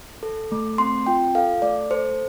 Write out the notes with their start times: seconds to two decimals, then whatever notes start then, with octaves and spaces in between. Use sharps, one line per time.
0.23 A4
0.52 A3
0.78 C4 C6
1.06 F4 G5
1.35 A4 F5
1.62 A3 D5
1.90 A4 C5